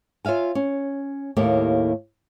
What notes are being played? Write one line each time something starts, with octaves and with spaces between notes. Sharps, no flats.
F4 C#5 E5 F5 G#5
C#4
D#2 A2 A#3 G4